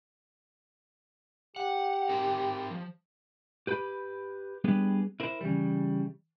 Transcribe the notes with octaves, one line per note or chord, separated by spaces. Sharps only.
G4 F#5
C4 D#4 A#4
F3
G4 B4 B5
G3 B3 D4 G4 G#4 B4
E4 A#4 C5
C#3 E3 G3